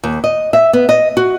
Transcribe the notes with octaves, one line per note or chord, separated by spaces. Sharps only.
D#2
D#5
E5
B3
D#5
F#4